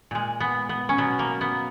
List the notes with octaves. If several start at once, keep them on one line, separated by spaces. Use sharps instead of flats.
A#2 G#3
B3
B3
C#4
B2 F#3 B3
A#3
B3